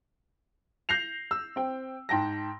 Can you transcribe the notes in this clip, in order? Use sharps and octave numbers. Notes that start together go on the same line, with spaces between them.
G6 A#6 C7 F7
E6
C4 G5
G#2 G5 A5 A#6